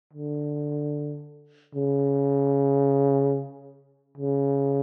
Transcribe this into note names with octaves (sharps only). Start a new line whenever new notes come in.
D3
C#3
C#3